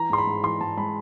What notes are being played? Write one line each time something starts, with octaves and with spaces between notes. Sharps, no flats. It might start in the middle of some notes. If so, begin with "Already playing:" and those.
Already playing: E3 A#5
G#2 C6
B5
G#2
E3 C6
G#2 A5
G#3 B5